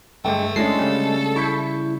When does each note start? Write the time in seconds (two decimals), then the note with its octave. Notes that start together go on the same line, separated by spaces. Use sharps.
0.25 G2 D3 G#3 A3 G5
0.56 G#3 A3 C#4 D4 A4 C7
0.79 C#3 G3
1.36 E4 C#6 G6 B6